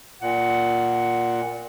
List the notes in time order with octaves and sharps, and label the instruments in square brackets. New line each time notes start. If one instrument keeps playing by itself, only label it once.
[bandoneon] A#2 [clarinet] F#5